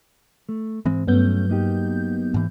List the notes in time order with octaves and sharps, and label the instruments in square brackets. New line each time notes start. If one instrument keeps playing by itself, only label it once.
[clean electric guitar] A3
[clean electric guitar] G#2 [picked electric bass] E3 G#3 C4
[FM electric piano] G2 B3 G6 [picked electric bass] F#3 [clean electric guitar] A3 C#4
[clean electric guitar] A#3 D#4 G4
[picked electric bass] G#2 E3